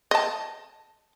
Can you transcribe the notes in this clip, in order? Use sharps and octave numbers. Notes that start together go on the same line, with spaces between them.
D#5 A5